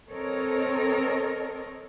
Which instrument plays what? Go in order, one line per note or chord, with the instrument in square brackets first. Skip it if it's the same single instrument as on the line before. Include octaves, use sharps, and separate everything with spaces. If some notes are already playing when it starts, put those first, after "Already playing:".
[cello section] C4 A4 A#4 C#5 D#5